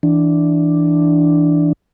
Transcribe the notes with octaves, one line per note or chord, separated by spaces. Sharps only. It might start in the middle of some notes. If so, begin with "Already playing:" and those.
E3 D4